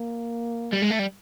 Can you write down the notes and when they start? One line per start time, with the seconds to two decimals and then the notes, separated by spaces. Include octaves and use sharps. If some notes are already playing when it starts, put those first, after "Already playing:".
Already playing: A#3
0.73 G3
0.82 G#3
0.91 A3
0.99 G3